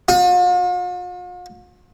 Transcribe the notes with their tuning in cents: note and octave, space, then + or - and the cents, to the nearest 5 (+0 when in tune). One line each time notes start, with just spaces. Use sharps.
F4 +45